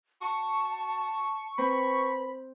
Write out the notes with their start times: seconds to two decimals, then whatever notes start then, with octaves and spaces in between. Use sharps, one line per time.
0.21 F#4 A5 C#6
1.58 C4 B4 B5